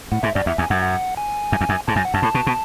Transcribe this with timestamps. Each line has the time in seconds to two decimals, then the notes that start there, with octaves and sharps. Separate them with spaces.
0.12 A2 F#5
0.23 G#2 E5
0.35 F#2 D5
0.46 E2 E5
0.58 E2 G#5
0.70 F#2 F#5
0.82 F#5
1.17 G#5
1.52 F#2
1.61 E2
1.69 F#2
1.88 G#2 A5
1.96 F#2 G#5
2.05 F#5
2.14 F#2 A5
2.22 A2
2.34 B2
2.47 B2